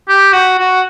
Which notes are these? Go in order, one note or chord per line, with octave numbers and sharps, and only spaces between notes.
G4
F#4
F#4